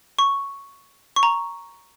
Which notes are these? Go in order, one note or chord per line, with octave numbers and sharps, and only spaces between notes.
C#6
C#6
A#5